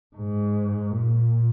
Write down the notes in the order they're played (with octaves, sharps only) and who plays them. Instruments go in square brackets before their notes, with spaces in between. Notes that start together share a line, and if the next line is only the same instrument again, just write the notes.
[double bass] G#2
A#2